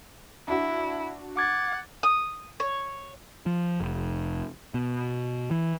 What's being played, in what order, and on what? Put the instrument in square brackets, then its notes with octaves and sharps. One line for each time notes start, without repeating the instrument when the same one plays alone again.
[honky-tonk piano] D4 F#4 [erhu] E4
[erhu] F#5 [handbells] D6 G#6 A6
[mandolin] D#6
C#5
[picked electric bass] F3
F1
B2
E3